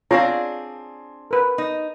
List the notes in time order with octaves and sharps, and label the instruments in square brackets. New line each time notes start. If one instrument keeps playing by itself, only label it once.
[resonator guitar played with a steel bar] C4 D4 G#4 [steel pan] F4 C#5 A#5
[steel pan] A#4 B4
[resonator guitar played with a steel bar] D#4